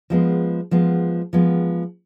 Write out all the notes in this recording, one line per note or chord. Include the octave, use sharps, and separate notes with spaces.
F3 G#3 B3
F3 G#3 B3
F3 G#3 B3